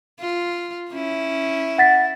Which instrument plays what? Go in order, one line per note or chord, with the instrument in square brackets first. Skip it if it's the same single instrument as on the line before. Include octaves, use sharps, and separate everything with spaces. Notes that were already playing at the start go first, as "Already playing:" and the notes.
[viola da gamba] F4
C#4 E4
[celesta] F#5 A6 B6